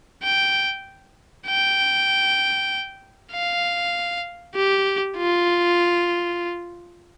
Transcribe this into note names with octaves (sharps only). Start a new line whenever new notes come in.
G5
G5
F5
G4
F4